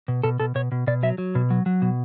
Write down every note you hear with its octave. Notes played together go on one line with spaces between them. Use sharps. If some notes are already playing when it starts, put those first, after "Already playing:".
B2
B2 A4
B2 A4
B2 C#5
B2
B2 D5
F#3 E5
F#3
B2
F#3
F#3
B2